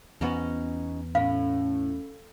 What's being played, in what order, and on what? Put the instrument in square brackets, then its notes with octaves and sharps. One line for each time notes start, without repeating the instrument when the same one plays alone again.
[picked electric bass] E2 B3 [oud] C#4 D#4 F#4
[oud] A2 [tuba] C#4 [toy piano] F5